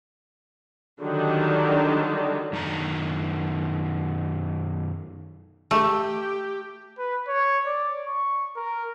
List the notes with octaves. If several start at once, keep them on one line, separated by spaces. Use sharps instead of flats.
D3 D#3 F#3 G3 D4
F#2 D#3 D4 A#5
A3 G4
B4
C#5
D5
C#6
A#4